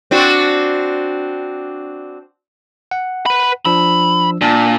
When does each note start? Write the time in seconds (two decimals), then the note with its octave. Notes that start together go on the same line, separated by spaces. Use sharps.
0.11 C4 D4 F#4
2.91 F#5
3.26 B4 B5
3.65 F3 D4 B5 E6
4.42 A#2 D4 A5